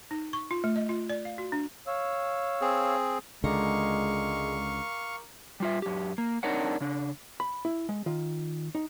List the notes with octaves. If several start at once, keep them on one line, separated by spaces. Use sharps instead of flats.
D#4
C#6
F4
A3
D#5
F4
D5
F5
F#4
D4
C#5 F5 E6
C4 G#4
C#2 D3 G#3 A#4 F5 A#5 C#6 D6
G3 F4 E5
F#2 G4
A#3
C4 D4 D#4 A#4 C#5 F#5
C#3 D4
B5
E4
G#3
D#3 F4
D#4